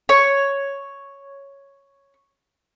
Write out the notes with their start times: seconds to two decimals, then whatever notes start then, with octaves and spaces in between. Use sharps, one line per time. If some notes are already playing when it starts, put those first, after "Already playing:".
0.09 C#5 C#6